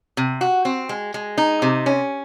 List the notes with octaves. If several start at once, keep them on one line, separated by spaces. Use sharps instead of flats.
C3
F#4
C4
G#3
G#3
D#4
C3
C#4